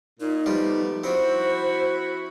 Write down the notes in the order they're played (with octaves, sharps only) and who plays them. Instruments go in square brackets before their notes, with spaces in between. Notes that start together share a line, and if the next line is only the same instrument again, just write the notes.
[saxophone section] A#2 [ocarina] D#4
[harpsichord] F3 G3 [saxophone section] A3 B3
[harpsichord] F3 C4 [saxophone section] E4 F#4 [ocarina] C5